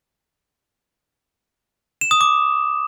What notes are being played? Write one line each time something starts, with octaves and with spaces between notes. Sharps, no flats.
E7
D#6
D6